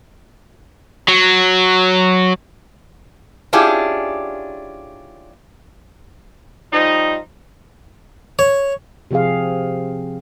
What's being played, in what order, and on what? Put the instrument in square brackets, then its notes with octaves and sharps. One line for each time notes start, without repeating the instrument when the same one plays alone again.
[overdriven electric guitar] F#3
[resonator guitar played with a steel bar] C#4 D4 E4 F4 G4 G#4
[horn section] F3 G3 D#4
[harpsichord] C#5
[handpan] C3 F3 C4 G#4 F5